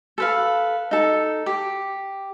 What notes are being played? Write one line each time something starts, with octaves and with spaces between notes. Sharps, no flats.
A4 B4 F5
D#4 A4
G4